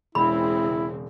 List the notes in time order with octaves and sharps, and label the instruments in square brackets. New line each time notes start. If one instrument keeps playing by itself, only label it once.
[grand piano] E1 [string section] C#3 G#3 C4 [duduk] E4 [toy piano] B5